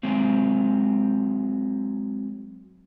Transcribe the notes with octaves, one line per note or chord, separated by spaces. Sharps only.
F#3 G#3 C4